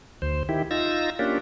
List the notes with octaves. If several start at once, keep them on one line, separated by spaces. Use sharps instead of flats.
D2 C5
D#3 E4 G4
D#4 F4 E6 A#6
A#3 C#4 D4 F4 G4